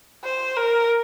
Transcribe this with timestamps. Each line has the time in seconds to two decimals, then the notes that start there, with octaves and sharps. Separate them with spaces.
0.24 C5
0.57 A#4